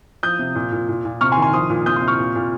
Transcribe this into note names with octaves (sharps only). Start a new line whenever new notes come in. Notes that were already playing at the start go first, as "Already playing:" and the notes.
F3 D#6 G6
C3
A#2
A#2
A#2
A#2
C3 C#6 F6
G#5 C6
D#3
G#5 C6
F3 C6 D#6
A#2
C3 D#6 G6
C6 D#6
C3
C#6 F6
A#2
A#2